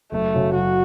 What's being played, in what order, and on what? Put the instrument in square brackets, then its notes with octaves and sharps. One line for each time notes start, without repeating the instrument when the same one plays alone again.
[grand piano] F#1 [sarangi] A3
[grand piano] F#2 C#3 F#3
[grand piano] F#1 [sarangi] F#4